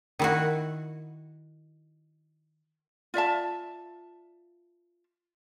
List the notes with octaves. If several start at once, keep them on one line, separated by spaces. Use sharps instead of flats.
D#3 E4 F#4
F4 D5 E5 A5